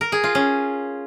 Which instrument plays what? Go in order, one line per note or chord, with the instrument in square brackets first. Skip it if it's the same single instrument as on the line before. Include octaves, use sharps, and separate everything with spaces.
[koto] A#4
G#4
F4
C#4